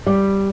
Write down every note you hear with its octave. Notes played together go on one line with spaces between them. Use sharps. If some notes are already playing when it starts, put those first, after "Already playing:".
G3